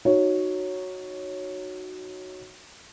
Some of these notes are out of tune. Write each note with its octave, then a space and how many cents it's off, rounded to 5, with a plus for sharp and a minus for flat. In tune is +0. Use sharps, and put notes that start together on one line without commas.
D#4 -10 F#4 +0 C#5 +0